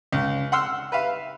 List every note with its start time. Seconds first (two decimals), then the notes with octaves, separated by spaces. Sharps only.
0.13 C#2
0.52 F#5 C6 E6 F6
0.92 B4 E5 F5